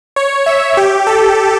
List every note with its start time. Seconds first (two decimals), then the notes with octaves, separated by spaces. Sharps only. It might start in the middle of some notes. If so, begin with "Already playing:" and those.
0.16 C#5
0.46 E5
0.77 G4
1.07 A4